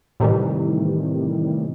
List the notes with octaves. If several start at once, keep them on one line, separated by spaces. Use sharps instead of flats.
A2 C3 D#3 E3 G3